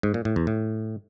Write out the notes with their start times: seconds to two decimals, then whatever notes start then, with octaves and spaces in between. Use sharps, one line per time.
0.03 G#2
0.14 A#2
0.25 A2
0.36 E2
0.47 A2